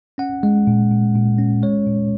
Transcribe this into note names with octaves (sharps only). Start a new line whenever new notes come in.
C#4 F#5
G#3
A#2
A#2
A#2
C#4
G#3 C#5
A#2